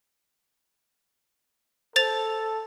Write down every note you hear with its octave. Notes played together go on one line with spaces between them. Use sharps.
A4 C5 A6 F7